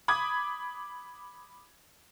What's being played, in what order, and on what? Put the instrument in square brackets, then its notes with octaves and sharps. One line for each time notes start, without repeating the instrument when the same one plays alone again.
[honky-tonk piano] B5 D6 D#6 G#6